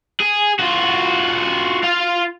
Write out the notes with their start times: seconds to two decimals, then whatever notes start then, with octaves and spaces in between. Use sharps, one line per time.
0.20 G#4
0.59 F4 F#4
1.84 F4 F5